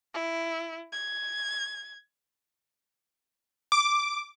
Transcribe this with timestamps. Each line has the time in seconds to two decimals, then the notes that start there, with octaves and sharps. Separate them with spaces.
0.15 E4
0.93 G#6
3.72 D6